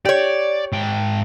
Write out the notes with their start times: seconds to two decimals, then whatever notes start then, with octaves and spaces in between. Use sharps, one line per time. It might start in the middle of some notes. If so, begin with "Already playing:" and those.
0.05 G4 C#5 D5
0.73 G#2 G5